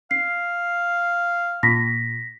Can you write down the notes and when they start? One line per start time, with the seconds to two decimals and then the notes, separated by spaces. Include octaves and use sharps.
0.11 F5 C7
1.63 A#2 A#6 B6